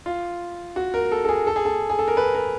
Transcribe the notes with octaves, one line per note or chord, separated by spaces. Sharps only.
F4
F#4
A#4
A4
A4
G#4
A4
G#4
A4
G#4
A4
A#4
B4
A#4